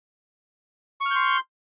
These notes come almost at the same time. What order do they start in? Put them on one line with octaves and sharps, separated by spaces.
C#6 F6 G6 C6